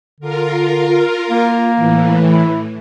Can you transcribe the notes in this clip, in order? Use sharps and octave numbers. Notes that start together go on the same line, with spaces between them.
D3 F4 A#4
A#3
A2 E3
E4